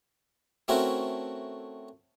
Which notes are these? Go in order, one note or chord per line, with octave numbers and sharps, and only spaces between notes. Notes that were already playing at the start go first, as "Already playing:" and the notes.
A3 C4 C#4 E4 F#4 A#4